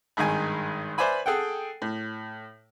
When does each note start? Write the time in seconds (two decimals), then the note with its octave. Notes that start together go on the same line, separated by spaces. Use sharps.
0.17 G#1 G2 D#3 G#3 D#5 G#5
0.98 B4 C5 D5 E5 G#5 B5
1.26 G#4 A4 F#5 G5
1.82 A2